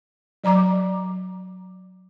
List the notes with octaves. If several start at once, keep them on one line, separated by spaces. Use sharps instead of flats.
F#3 D5 A#5 D6